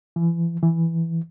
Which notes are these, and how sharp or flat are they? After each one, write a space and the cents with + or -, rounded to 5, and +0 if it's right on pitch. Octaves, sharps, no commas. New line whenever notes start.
E3 +35
E3 +5